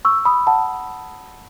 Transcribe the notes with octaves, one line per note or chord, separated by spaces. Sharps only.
C#6 E6
B5 D#6
F#5 A5